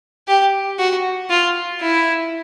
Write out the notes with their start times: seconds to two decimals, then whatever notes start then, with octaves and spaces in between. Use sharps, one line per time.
0.28 G4
0.78 F#4
1.30 F4
1.81 E4